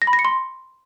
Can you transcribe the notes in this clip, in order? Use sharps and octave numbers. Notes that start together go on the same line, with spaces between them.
A#6
B5
A#6
C#7
C6